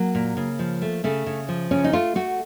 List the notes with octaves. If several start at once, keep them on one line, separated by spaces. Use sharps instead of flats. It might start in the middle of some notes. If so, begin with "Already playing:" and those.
Already playing: F#3 A#3
A#2
C#3
F3
A3
C#3 A3
C#3
F3
C#3 C#4
D#4
A3 F4
A3 F#4